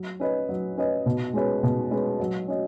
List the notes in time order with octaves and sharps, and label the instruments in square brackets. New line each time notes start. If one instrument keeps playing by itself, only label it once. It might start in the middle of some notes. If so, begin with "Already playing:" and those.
Already playing: [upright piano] F#3
C#4 B4 D#5
F#3
C#4 B4 D#5
B2
G#3 C#4 B4
B2
G#3 C#4 B4
F#3
C#4 F#4 D#5